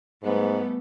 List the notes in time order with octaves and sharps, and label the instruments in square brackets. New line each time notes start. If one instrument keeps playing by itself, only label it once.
[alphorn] G#2 [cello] G3 A3 [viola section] B3